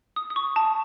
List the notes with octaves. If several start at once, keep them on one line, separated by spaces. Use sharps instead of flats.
D#6
D#6
C#6
A5